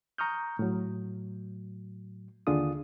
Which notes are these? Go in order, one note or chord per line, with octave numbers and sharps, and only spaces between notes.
A#5 C#6 D#6 F6 G6
A2 F#3
D#2 D3 D4 F4 G#4 D#6